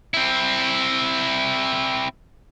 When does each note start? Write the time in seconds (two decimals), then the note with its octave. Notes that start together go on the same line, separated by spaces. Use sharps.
0.14 C4 E4